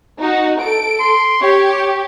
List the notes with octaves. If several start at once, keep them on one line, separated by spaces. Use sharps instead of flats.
D#4 F#4
A4 D7
C6
G4 C#5